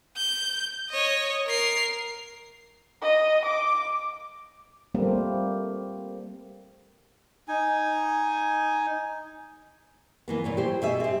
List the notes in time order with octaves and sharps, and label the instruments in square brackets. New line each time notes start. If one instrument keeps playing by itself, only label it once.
[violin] G6
C#5 D#5
A#4 C7
[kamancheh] D#5
D6
[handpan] G3 A3 A#3 C4
[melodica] D#4 G#5
[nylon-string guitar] E3 A#3 B3
A#2 E3 C#5
E4 G4 C5
B2 G#4 E5
C4 G4